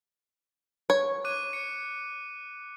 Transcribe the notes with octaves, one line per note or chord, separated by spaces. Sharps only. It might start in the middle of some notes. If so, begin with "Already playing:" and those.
C#5
D6 F#6 D#7
C#7